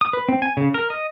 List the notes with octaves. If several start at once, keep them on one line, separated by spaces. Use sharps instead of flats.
D#6
B4
C4
G#5
C#3
A#4
D#5